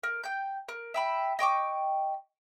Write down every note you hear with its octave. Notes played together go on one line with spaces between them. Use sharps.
A#4
G5 G6
A#4
E5 G5 B5
D#5 G5 C#6 D6